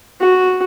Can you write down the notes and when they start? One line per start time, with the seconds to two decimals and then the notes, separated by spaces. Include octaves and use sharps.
0.20 F#4